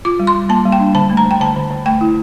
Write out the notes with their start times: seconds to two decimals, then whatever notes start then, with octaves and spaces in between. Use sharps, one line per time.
0.05 F4 D6
0.20 G3
0.27 C6
0.35 F4
0.49 A#3 A5
0.65 G3
0.72 G5
0.80 D4
0.95 D3 A5
1.10 A3
1.17 A#5
1.25 D3
1.31 G5
1.41 D3 A5
1.56 D3
1.71 D3
1.86 A3 G5
2.01 E4